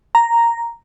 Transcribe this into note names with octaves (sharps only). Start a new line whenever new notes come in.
A#5